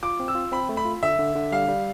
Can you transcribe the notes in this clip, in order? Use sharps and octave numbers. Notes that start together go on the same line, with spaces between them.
F4 D6
C4
E6
F4
C4 B5
A3
B5
F4
D3 E5
D3
D3
G3 F5
G3